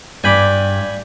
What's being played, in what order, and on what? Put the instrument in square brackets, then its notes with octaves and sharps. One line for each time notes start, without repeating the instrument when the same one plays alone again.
[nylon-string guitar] G2 [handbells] D5 G6 B6 [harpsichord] G#5 B5 D6